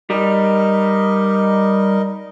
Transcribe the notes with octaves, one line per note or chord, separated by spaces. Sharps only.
G3 D#4 A#4 D#5